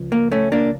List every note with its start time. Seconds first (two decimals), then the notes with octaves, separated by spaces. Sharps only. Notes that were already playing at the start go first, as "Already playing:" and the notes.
Already playing: C#2 F3
0.12 A#3
0.32 A3 C#4
0.52 A#3 D4